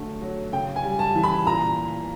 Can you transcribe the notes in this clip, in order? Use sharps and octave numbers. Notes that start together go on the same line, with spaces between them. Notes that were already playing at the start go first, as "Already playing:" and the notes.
Already playing: D3 F#3 A3
F#3
C#3 G5
G#5
G3
A5
E3
B5
A#2 A#5